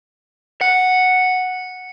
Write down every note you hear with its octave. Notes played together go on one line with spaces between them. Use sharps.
F#5 C#7